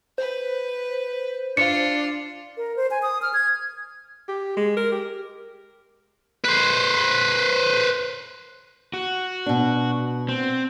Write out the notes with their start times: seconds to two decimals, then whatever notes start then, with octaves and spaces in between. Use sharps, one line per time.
0.18 B4 C5
1.57 D4 F4 C#7
2.57 A#4
2.77 C5
2.91 G#5
3.02 D#6
3.22 F6
3.34 G#6
4.28 G4
4.57 G#3
4.77 A#4
4.92 G4
6.45 B4 C5
8.94 F#4
9.46 B2 D4
10.29 C4